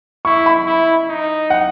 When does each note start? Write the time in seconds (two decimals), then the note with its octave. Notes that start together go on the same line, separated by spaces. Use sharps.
0.25 E4 C#6
0.46 B5
0.66 E4
1.09 D#4
1.50 F#5